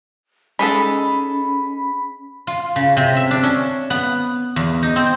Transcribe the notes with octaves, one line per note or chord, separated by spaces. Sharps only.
G#3 C#4 D#4 A4 B5
F4
C#3
C3
E5
D4
C#4
B3
E2
D#4
C4